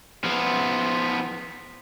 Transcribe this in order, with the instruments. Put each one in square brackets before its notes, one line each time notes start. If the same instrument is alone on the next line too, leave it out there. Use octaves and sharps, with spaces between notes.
[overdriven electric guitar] F3 B3